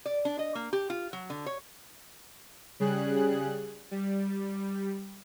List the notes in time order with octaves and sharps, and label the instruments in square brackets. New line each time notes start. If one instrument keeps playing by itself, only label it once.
[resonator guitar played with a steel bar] D5
D4
D#5
A#3
G4
F4
F#3
D3
C#5
[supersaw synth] C#3 G3 G#4 F#6
G3